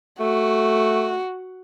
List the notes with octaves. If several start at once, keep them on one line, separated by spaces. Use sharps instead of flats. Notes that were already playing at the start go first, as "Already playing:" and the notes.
A3 F#4